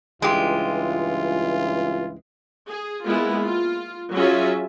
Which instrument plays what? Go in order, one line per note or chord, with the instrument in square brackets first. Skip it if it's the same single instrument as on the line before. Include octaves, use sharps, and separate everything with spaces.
[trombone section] C#2 G2 E3 [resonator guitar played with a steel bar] G#3 G4 [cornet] F4
[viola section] G#4
G#3 A#3 B3 E4 F4
F4
F#3 C#4 F4 G#4 E5